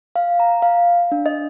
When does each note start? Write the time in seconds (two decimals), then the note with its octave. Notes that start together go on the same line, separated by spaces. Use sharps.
0.16 F5
0.40 A#5
0.62 F5
1.12 D4
1.26 D#5